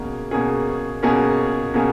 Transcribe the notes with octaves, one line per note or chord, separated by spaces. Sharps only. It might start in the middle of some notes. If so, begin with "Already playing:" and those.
Already playing: B2 A#3 C#4 G#4
B2 A#3 C#4 G#4
B2 A#3 C#4 G#4
B2 A#3 C#4 G#4